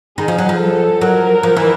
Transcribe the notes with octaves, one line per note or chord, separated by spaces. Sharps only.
D#3 G#4
F3
F#3
F3
A4
F#3 A#4
F3
E3